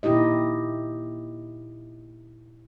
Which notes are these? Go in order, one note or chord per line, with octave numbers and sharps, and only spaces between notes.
A#2 D#4 E4 G4 D#5